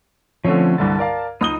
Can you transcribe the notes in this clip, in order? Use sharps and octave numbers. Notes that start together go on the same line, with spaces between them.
D3 F3 A3 C4 C#4 C#5
C2 G2 D3 A5
A#4 D5 F5
C#2 D#4 D#6 G7